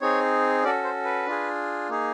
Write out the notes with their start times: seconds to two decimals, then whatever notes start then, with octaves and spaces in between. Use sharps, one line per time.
0.01 C4 D#4 G#4 C#5
0.63 C#4 F#4 A4 D5
0.84 C5
1.05 B4
1.26 D4 F4 G#4
1.89 A#3 D#4 G#4